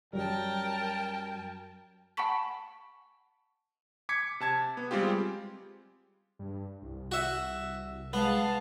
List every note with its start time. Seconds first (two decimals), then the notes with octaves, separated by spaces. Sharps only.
0.13 F#2 F#3 G3 A#4 G5 A5
2.17 F#5 G#5 A5 B5 C#6 B6
4.09 D6 G#6 B6 C#7
4.40 C3 A5 G#6
4.77 B3
4.91 G3 G#3 C4 F4 G4
6.39 G2
6.82 C2
7.12 F#4 E5
8.13 G#3 B3 F5 A5